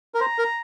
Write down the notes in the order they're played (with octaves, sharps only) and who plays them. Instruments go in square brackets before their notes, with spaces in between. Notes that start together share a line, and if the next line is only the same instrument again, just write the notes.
[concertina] A#4
[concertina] C5 [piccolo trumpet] A#5
[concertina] A#4